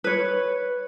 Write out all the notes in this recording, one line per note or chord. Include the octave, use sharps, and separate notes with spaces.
B4 C#5